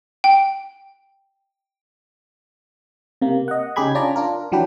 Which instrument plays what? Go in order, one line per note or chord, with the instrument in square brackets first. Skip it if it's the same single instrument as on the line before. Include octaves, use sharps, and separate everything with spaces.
[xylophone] G5
[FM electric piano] C3 A#3
D#5 F#5
C#3 D#4 G4 G#4 B5 G#6
C#4 D4 F4 D5 A#5
D4 F4 A#4
E3 F#3 D4 G4 B4